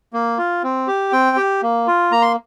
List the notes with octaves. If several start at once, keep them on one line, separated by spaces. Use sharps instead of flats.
A#3
F4
C4
G4
C4 G5
G4
A#3
F4
A#3 A#5
C6